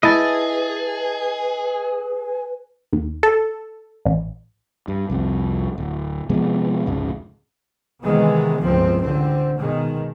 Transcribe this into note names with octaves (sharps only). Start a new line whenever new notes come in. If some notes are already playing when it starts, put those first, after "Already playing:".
E4 G#4 B4 D#5 A5
D#2
A4
A1
G2
C2 F2 C3
D1
C3 F3 G#3 B3
F1 C#2 G#2 C#3
C3 D#3 E3 G#3 B3
G1 C#2 A2 F3 C4
A1 D3 C4
B2 D#3 G#3